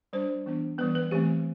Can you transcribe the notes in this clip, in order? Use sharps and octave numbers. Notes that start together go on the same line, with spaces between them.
G3 D4 C5
E3 B3 D4
E3 G3 B3 B4
B4
E3 A3 C4 G4